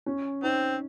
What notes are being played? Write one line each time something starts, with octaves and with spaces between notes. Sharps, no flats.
C#4
C4 D#4